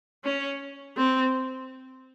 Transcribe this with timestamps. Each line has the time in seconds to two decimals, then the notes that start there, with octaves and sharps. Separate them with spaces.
0.24 C#4
0.97 C4